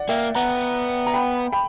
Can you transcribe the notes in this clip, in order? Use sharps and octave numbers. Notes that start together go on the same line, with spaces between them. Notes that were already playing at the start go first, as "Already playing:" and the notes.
Already playing: D5 F#5
A#3 E5 G5
B3 F#5 A#5
A#5
G5 B5
G5 B5